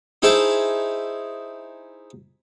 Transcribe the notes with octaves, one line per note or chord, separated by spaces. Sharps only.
D#4 E4 G#4 C5 E5 A5